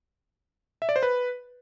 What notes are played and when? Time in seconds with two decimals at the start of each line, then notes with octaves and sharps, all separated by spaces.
0.82 E5
0.89 D5
0.96 C5
1.03 B4